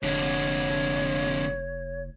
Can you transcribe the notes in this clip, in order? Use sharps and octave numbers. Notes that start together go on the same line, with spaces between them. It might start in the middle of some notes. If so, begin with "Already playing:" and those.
F1 F2 D3 C#5